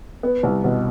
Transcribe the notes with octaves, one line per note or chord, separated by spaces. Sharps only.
B3
C2
B2